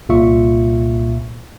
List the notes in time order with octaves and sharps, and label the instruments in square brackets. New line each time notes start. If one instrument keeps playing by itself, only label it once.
[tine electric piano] C2 A#2 F4 E5 C#6